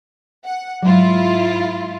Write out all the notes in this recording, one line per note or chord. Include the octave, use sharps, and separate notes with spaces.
F#5
G#2 F#3 E4 F4